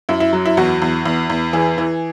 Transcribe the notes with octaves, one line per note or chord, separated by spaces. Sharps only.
F#2 E4
E4
F#3
E4
E2 F#4
E2
E2
E2
E3 G#4
E3